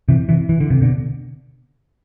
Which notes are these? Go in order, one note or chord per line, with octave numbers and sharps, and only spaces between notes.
C3 E3
C3 E3
E3
D3
C3
B2 D3